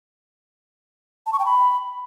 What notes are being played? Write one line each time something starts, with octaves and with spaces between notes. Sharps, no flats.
A5
C#6
G5
B5